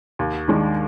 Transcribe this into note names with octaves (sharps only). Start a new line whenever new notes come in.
D#2
D#3 G#3 D4